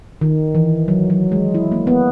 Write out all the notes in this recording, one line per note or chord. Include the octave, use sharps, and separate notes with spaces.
D#3
E3
F#3
F#3
G#3
E4
A#3
B3